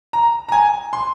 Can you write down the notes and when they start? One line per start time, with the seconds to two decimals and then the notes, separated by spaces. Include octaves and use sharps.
0.13 A#5
0.49 A#5
0.52 G#5
0.93 C6